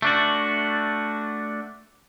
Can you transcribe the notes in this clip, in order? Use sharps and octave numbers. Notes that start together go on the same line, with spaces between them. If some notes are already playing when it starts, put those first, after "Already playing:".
A3 D4 F#4